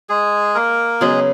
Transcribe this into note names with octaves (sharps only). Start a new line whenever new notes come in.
G#3 G#4
A#3 A#4
C#3 F#3 G#3 B3 G#4